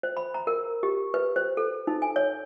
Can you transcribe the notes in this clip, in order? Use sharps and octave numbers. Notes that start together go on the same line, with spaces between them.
C5
B5
A#5
A#4
G4
B4
C5
A4
D#4
G#5
C#5